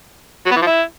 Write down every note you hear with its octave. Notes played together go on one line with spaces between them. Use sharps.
F#3
B3
E3
F3
E4